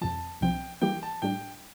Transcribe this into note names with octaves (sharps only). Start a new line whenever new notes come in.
F2 C3 F3 A5
C2 C3 F3 C4 G5
E3 G3 A#3 E4 G4 G5
A5
A2 G3 D4 G5